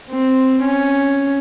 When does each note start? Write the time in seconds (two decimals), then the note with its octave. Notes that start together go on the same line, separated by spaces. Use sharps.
0.10 C4
0.61 C#4